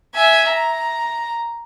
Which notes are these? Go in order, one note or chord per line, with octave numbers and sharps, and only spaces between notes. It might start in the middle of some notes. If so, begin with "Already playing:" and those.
E5 G#5
A#5